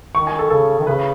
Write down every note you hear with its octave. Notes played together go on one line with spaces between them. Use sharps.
D#3 C#6
G#5
A4
C#3 A4
D#3
C#3 B4